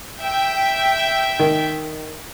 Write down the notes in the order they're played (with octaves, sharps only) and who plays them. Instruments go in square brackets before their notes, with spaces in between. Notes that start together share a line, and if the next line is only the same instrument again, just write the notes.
[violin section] E5 G5
[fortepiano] D#3